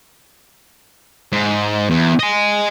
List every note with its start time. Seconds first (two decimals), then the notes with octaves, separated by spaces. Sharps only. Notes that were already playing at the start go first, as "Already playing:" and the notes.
1.32 G#2
1.90 E2
2.19 D#5 G#5